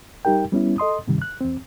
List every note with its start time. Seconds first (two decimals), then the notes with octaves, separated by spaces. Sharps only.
0.25 G3 D#4 G4 A#4 G5
0.52 G3 B3 C#4 E4
0.78 A4 D#5 C6 D#6
1.08 G2 C3 D#3 G3
1.22 F#6
1.41 E2 C4